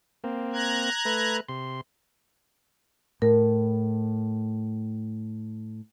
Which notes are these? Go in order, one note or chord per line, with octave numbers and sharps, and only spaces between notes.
A#3 C4
A#5 F#6 G#6
A3 B4
C3 C6
A2 A#4